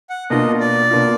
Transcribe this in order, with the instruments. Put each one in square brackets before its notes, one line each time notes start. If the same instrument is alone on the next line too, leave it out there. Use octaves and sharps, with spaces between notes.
[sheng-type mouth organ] F#5
[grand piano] B2 A#3 D4 F4 [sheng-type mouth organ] D#5
[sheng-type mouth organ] D5
[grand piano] B2 A#3 D4 F4